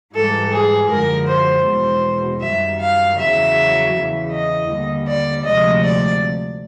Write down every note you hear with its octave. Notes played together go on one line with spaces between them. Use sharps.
G#2 E3 G3 A4
G#4
F#2 D3 F3 G#3 A#4
C5
E2 B2 G#3 C5
F#2 D#3 G3 E5
F5
E2 C#3 F#3 E5
E2 C#3 E3
D#5
D#2 D3 G3
D5
D2 C3 F3 G#3 D#5
D5